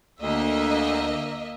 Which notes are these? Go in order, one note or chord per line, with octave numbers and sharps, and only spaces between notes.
D2 A#3 D#5 E5